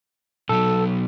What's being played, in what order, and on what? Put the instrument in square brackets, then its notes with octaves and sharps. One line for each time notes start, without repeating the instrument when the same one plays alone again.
[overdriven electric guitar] B1 F#3 [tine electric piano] A4